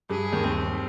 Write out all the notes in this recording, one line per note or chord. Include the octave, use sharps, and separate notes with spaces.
G2 G3 G#4
D#2 D#3
D#2 D#3 C4